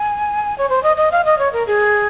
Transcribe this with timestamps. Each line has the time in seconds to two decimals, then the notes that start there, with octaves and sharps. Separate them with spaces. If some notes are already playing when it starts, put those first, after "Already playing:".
Already playing: G#5
0.58 C#5
0.69 C5
0.83 D#5
0.97 D#5
1.12 F5
1.25 D#5
1.38 C#5
1.53 A#4
1.67 G#4